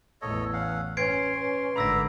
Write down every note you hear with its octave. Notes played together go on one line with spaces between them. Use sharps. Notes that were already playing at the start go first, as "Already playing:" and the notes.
A1 E2 A4 C#5 D#5 E6
C#4 F5 F#5
C#4 B4 C6 G#6 C7 D7
B4
G#1 D3 E5 A#5 B5 D6 E6 A#6